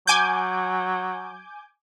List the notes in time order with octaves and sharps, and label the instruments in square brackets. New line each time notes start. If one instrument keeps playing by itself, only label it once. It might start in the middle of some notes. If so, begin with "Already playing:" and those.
[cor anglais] F#3 [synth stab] G#5 D6 G6